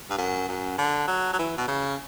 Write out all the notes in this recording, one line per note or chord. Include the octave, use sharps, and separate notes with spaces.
G2
F#2
F#2
D3
F#3
F#3
E3
B2
C#3